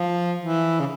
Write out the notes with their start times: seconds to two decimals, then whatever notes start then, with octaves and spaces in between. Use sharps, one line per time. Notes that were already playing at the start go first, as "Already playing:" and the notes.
Already playing: F3
0.38 E3
0.80 C#3